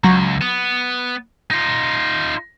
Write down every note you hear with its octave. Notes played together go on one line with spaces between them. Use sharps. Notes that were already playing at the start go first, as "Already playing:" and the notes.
C#2 F#3 A#5
B3
D#4 F4